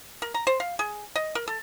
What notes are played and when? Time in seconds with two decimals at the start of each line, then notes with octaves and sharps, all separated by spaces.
0.22 A#4
0.34 A#5
0.47 C5
0.60 F5
0.79 G#4
1.15 D#5
1.35 A#4
1.48 A4